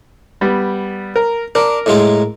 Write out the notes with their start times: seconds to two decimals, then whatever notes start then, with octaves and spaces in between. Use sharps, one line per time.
0.41 G3 B3
1.16 A#4
1.55 D4 A#4
1.86 A2 G#3 F4